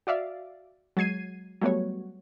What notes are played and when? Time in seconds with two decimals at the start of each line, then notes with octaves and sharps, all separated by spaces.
0.07 F#4 D5 E5 F5
0.97 F#3 G#3 G#6 C7 D#7
1.61 F#3 G3 A3 B3 F#4 C#5